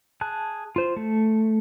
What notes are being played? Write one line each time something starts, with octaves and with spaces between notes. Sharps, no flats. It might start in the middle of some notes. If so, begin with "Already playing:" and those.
G#4 A5 F#6
F4 C5
A3